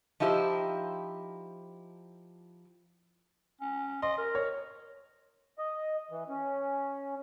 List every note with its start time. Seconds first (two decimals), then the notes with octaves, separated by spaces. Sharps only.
0.20 F3 D#4 E4 G4 B4 C5
3.61 C#4
4.02 D#5 C6
4.18 A#4
4.35 C#5
5.58 D#5
6.11 E3
6.29 C#4